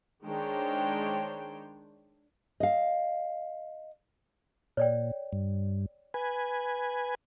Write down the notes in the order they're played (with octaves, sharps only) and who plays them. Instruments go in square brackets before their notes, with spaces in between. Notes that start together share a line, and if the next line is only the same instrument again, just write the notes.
[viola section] D#3 G#3 D4 C5 C#5 G5
[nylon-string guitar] D#5 F5
[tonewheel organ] A#2 [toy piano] C#5 D5 G5
[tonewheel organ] G2
B4 G#5